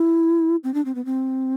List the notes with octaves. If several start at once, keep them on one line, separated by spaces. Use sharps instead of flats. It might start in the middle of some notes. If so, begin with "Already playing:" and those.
Already playing: E4
C4
D4
C4
B3
C4